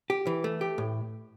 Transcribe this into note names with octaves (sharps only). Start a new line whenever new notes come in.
G4
E3
A3
G4
A2